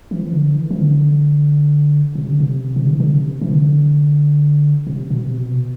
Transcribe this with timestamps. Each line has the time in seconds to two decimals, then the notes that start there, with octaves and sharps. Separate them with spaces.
0.11 E3
0.18 F3
0.26 E3
0.33 D3
0.56 E3
0.71 E3
0.79 D3
2.15 C3
2.28 D3
2.40 C3
2.76 C3
2.83 D3
2.93 E3
3.00 D3
3.17 C3
3.41 E3
3.51 D3
4.87 C3
5.10 B2
5.21 C3
5.38 B2